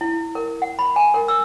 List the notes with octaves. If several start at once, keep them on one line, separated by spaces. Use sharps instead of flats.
E4
A#4
F#5
B5
G#5
A#4
E6